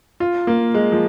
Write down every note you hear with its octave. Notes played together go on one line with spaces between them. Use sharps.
F4
A#3
G#3
F3